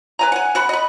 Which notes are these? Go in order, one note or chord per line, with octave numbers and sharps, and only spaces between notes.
B4 G#5 A#5
F#5 G#5
F#4 F#5 B5
D#5 B5